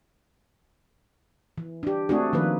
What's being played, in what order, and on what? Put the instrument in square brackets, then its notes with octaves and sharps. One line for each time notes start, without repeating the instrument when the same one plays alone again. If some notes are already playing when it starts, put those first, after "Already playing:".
[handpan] E3
D4 G4
A3 C4 D4 F#4 G#4
D#3 F3 A#3 B4